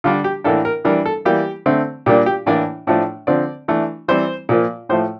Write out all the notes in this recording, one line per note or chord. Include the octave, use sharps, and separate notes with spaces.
D3 G3 D4 F4
G4
A2 E3 A#3 D4 A4
A#4
E3 G3 D4 A#4
A4
E3 G3 A#3 G4
D3 A3 C4
A#2 G3 A#3 D4 G4
G4
A2 E3 A#3 D4 D5
A2 F3 A3 D4
D3 F3 C4 D5
E3 A3 D4
E3 G3 C4 C5
A#2 F3 A#3
A2 F3 A3 C5